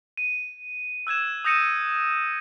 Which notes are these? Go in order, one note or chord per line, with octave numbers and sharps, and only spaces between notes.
D#7
E6 F#6 G#6 E7
D#6 G6 A#6 C#7 D#7 E7